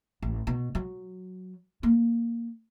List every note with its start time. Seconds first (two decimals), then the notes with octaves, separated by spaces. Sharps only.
0.22 A1
0.47 B2
0.75 F#3
1.83 A#3